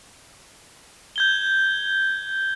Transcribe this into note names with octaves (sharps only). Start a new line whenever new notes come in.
G6 G#6 G7